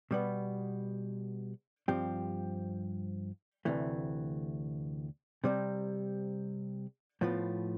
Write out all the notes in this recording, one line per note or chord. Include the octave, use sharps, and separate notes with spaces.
B2 G3 B3
G2 F3 C4 G4
D2 C3 E3 A3
C3 G3 C4
A2 F3 B3 F4